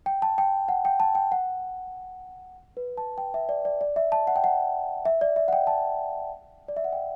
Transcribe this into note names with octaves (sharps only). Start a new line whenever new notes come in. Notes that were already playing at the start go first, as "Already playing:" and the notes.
G5
A5
G5
F#5
G5
A5
G5
F#5
B4
A5
G5
E5
D5
D5
D5
E5
A5
F#5
G5
F#5
E5
D5
E5
F#5
G5
A5
D5
E5
F#5
G5